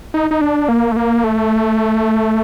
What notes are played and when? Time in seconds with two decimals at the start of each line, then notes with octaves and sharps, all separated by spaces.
0.14 D#4
0.31 D#4
0.41 D4
0.69 A#3
0.92 A3
0.96 A#3
1.24 A3